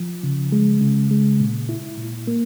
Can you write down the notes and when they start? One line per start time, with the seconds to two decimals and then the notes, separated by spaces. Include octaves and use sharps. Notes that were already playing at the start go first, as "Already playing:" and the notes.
Already playing: F3
0.23 C#3
0.52 G#3
0.81 C#3
1.11 G#3
1.40 A#2
1.69 E4
1.98 A#2
2.27 A#3